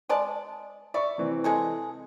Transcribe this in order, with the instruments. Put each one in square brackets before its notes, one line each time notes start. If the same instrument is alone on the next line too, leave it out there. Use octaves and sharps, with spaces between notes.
[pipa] G#3 D5 A5
[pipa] D5 [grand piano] E5 B5 C#6
[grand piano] C3 E3 C4
[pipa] G#3 G#4 A4